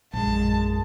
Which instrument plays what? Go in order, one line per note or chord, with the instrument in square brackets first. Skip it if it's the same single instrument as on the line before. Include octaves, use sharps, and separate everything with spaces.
[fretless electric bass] A#1 [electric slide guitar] F#2 G#3 [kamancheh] A5